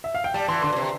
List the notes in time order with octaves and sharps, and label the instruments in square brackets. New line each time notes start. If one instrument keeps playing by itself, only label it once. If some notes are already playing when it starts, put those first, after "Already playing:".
[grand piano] E5
F5
G5
[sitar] G3 [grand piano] A5
[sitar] E3 [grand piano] C6
[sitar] D3 [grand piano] C6
[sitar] B2
C3